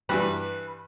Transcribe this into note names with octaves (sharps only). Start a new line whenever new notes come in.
G2 E3 G3 B4